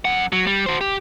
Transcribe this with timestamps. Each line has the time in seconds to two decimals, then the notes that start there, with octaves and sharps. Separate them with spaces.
0.05 F#2 F#5
0.32 F#3
0.47 G3
0.66 F#4 C5
0.81 G4